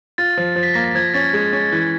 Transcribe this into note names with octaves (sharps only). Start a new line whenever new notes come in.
F4 A6
F3
F3
B6
A#3 A#6
A6
F3 G#6
C#4 A6
G#3
C#4
E3